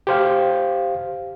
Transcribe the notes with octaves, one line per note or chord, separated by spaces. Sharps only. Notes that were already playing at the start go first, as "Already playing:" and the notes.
G4 C5 F5